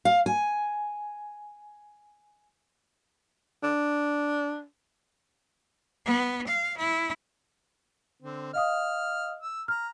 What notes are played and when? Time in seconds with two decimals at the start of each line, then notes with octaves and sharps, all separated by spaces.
0.05 F5
0.26 G#5
3.63 D4
6.06 B3
6.47 F5
6.77 E4
8.22 D3 C4
8.53 D#5 F5 D#6 F6
9.42 E6
9.68 A#5 F6